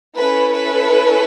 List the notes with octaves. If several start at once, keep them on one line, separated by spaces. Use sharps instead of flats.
C#4 E4 A4 B4
B4